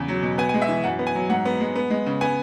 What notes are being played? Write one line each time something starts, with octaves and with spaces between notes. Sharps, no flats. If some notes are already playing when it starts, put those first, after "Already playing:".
Already playing: E2 C#3
F#3
B2
B3 G#5
G#5
G#3
E5
E3
F#2 F#5
B3
G#5
F#3
G#2 F#5
B3
G#3
B3
G#3
C#3
B3 G#5